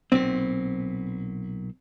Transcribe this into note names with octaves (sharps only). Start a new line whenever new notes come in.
B1 A#2 C4